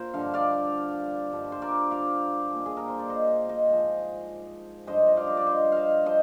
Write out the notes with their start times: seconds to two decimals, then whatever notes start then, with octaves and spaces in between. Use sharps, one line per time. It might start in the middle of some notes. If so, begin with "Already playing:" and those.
Already playing: A#2 F4 A#4 C5
0.14 G2 D3 F3 F5
0.34 D5 F5
1.32 G2 F3
1.52 C5
1.62 A#4 D5
1.91 D5 F5
2.51 A#2 F3
2.66 G#4
2.77 A#4
2.88 C5
2.99 D5
3.10 C5 D#5
3.49 C5 D#5
3.69 G#2 F3
4.87 G2 F3 C5 D#5
5.08 D#5
5.17 D5 F5
5.27 C5
5.37 D5
5.47 C5 D#5
5.72 C5 D#5 F5
6.06 F3 C5 D#5